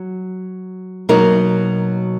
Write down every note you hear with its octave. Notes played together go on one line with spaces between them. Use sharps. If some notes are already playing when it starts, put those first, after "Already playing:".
Already playing: F#3
B2 F#3 A#3 D#4 A#4